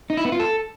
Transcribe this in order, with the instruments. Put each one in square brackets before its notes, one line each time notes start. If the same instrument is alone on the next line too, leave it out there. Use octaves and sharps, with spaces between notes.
[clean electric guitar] D#4
E4
B3
F4
A4